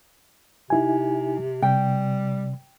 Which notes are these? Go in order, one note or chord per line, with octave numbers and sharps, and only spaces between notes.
C3 D#4 E4 G#5
C3 G3 G5